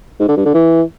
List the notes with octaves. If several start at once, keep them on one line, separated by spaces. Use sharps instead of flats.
G#2
D3
G2
D3
E3